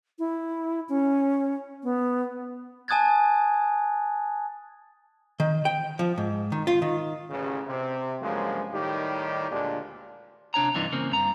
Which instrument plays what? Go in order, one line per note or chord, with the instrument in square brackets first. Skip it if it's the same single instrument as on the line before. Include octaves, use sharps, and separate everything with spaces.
[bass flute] E4
C#4
B3
[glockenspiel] G#5 A5 D#6 F#6 G#6 A6
[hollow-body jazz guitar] D#3
G5
F3
G#2
D#3
F4
D#3
[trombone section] A1 C#3
C3
G2 C#3 F3 F#3 G#3 A#3
A2 D#3 G3 D#4 G4
D2 A#2 G#3 D4
[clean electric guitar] C3 D4 C#5 A#5
G2 C3 E3 D4 D#4
C#3 A#3 C4
G2 A#5